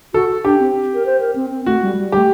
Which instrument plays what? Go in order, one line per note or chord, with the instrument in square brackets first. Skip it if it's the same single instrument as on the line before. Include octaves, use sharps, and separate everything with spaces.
[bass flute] F#4 [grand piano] A4
[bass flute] D4 [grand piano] G4
[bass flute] C4
A#4
C5
A#4
C4
C4
[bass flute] A3 [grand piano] F#4
[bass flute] G3
G3
[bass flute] A3 [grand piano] G4